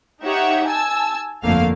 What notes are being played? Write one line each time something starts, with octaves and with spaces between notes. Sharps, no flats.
D#4 G4 C#5 E5 F#5
G#5 A5 E6
G1 F2 D3 A3 A#3 F5